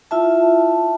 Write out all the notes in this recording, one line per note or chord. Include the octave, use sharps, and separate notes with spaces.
E4 F4 E5 A5